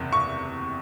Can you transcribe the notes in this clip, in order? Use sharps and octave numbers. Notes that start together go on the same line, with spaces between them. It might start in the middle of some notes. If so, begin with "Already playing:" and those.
Already playing: F#1 E2 C3
C#6